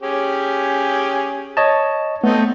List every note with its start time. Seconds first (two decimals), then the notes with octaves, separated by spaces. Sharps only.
0.02 C#4 G4 G#4
1.57 C#5 D#5 A5
2.24 A3 B3 C4 D#4